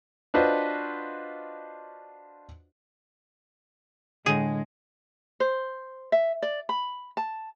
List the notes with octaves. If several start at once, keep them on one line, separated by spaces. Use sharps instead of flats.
D4 F4 F#4 B4 C5 D#5
A2 D3 G#3 G#4
C5
E5
D5
B5
A5